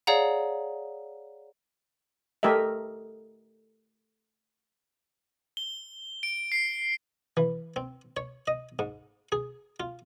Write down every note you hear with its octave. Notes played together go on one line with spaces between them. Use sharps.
G#4 C#5 D5 F5 F#5 A#5
A3 G4 A#4 D#5 E5
G7
D7
C7
E3
C4
C#5
D#5
G#2
G#4
F4